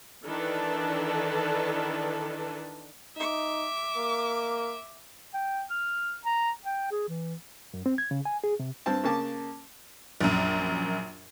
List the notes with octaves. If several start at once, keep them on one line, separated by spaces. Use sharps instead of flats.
D#3 E3 D4 A4 B4 D5
D#4 E5 D6
A#3
G5
F6
A#5
G5
G#4
E3
F#2
C4
G#6
C#3
G#5
G#4
C3
G2 C4 A5
C#3 A#3 A5 D6
A#1 F#2